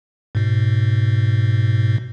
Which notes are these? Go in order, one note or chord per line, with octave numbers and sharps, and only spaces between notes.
G#2 B2